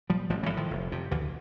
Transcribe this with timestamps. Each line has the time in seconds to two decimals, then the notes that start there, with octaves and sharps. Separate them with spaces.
0.09 A#2 F3 G3
0.30 A1 F3 G3
0.43 E3 F#3
0.50 A2
0.57 D#3 F3
0.71 F1
0.92 F2 C3
1.11 D2 D3 E3